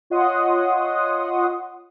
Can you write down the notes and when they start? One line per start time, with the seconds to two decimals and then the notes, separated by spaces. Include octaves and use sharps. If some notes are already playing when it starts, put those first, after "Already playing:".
0.10 F4 C#5 D#5 F#5 C6 D#6